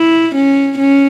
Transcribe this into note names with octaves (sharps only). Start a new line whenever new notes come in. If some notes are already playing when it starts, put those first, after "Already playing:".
Already playing: E4
C#4
C#4